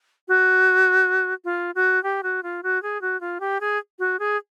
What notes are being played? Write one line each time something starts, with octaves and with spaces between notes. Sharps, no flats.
F#4
F4
F#4
G4
F#4
F4
F#4
G#4
F#4
F4
G4
G#4
F#4
G#4